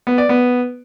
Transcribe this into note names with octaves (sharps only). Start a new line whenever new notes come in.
B3
D5
B3